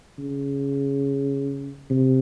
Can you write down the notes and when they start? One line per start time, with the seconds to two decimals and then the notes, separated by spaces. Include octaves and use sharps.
0.18 C#3
1.90 C3